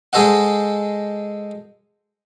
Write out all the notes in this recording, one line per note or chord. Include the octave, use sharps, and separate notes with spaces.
G#3 G#4 A4 C5 D#5 F#5